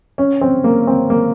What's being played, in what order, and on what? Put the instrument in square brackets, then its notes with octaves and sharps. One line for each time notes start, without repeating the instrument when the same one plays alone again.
[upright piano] C#4
C4
A#3
C4
A#3